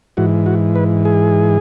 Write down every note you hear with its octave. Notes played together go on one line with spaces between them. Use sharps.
G#2 E3 F#4
F#4
B4
G#4